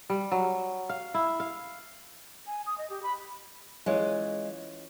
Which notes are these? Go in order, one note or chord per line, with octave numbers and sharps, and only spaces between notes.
G3
F#3
F5
E4
F5
G#5
D#6
D#5
G4
B5
E3 G#3 C#4 F4